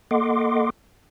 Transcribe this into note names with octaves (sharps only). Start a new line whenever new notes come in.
A#3 A4 D#5 F#5 C6 D6